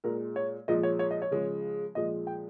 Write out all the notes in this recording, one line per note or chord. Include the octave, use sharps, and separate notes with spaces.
A#2 G#3 A#4
C#5
A#2 F3 G#3 D#5
C#5
C#5
D#5
C#5
C#3 F3 G#3
A#2 F3 G#3 D#5
G5